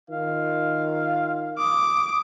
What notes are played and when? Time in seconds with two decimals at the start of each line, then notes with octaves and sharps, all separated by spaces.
0.10 D#3 F4 F5
1.58 D6 D#6